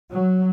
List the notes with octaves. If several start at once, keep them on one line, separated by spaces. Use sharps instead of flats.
F#3